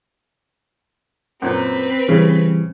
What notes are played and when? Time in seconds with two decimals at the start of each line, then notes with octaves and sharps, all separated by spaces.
1.42 F#2 A#2 C4 B4
2.09 C#3 E3 G3